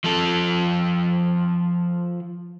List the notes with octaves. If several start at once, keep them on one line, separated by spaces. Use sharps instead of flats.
F3 A4